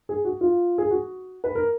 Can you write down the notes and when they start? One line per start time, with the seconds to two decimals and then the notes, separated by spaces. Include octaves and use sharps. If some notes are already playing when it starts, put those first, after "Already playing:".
0.09 G#4
0.25 F#4
0.41 F4
0.78 G#4
0.90 F#4
1.44 B4
1.55 A#4